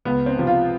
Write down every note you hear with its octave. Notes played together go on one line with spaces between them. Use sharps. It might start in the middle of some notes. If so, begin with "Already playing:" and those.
C#2 B3
C4
C3 F3
F4